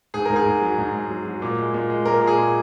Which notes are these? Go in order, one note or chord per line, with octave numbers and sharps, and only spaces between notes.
G#2 G#4
G#2 A#4
G#4
G#2
F#3
G#2
G#2
F#3
F#3
A#2
G#3
A#2
G#3
A#2 A#4
A#2
G#4
A#2